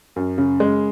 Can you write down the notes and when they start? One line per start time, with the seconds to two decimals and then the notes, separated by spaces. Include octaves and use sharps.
0.16 F#2
0.38 C#3
0.60 G#3